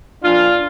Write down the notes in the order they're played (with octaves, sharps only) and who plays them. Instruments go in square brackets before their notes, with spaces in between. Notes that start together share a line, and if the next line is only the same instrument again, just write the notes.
[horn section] A#2 F3 D4 F4